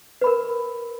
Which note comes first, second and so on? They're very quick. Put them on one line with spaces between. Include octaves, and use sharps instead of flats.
B4 B5 A#4